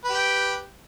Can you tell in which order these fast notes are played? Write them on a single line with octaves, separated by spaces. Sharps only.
B4 G4 G5